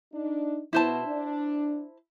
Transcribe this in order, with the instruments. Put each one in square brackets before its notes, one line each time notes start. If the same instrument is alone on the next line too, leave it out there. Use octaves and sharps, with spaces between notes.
[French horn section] D4 D#4
[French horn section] B2 [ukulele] E4 C5 A5
[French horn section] D4